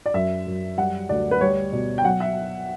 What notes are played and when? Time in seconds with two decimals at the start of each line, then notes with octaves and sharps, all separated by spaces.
0.06 D5
0.14 F#2 E5
0.47 F#2
0.78 G3 F#5
1.09 D2 D5
1.31 B4
1.41 G3 C#5
1.72 B2 D5
1.98 G5
2.05 F#3 F#5
2.20 E5